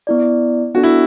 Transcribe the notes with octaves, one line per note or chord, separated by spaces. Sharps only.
B3 E4 D5
B3 D4 F#4 A4
E4